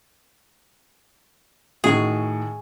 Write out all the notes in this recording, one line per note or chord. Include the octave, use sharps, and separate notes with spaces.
A2 D#3 F#4 G#4